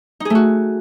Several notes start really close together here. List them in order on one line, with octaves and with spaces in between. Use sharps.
D#4 G#4 A3 F#4